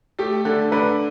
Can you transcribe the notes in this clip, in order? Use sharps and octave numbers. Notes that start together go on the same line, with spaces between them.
A3 G4
D3 A4
D3 B4